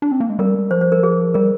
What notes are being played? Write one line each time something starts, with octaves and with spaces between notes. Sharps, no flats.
D4
C4
A#3
G#3
G3 A#4
F3 C5
C5
A#4
G#4
G3 A#4